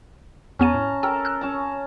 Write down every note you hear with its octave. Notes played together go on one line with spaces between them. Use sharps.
E2 B3 C#4 A5 A#5 D#7
A2
A4 A#4 G5
F6 F#6
C#4 A5 A#5